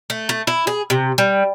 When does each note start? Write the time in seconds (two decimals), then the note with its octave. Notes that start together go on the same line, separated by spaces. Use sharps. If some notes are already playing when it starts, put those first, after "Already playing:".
0.10 A3
0.29 A3
0.47 E4
0.67 G#4
0.90 C3
1.18 G3